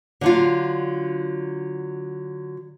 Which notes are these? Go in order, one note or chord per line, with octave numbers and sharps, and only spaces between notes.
D3 F#3 F4